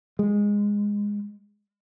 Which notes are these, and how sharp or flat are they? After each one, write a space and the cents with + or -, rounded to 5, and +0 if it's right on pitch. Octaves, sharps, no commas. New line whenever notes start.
G#3 -15